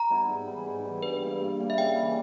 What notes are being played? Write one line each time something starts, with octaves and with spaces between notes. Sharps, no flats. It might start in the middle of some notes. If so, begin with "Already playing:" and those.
Already playing: A#5
G3 B3 E4
G#2
E3 G3
G#2
E3 G3
G2 B4
G3 A#3 E4
G2
G3 A#3 E4
E5
C#3 G5
E3 G3